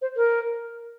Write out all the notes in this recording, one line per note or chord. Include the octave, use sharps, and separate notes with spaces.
C5
A#4